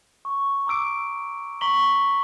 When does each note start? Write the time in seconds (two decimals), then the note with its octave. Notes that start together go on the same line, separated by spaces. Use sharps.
0.25 C#6
0.67 A#5 D6 E6 D7
1.61 A#5 C#6 B6 F#7 G7